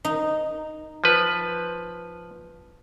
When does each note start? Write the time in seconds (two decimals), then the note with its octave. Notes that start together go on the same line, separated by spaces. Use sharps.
0.05 D#4
1.04 F3 B4